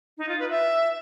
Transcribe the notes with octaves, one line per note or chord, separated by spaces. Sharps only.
D#4
F4
B4
E5